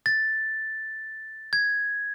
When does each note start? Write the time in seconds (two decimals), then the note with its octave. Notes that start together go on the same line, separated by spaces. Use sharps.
0.06 A6
1.53 G#6